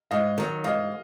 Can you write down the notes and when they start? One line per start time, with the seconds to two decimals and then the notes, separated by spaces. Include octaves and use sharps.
0.11 G#2 D#5 F5
0.38 D#3 F#3
0.64 G#2 D#5 F5